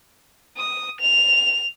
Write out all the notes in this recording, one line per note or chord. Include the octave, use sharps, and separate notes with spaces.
D#6
F7